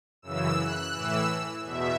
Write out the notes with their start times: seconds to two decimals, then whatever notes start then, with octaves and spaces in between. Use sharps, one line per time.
0.22 F#2 C#3 E3 E6
0.58 F#6
0.93 A2 E3 E6
1.64 E2 B2 E5